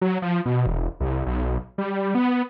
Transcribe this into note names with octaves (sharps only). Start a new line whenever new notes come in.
F#3
F3
B2
E1
C2
B1
G3
B3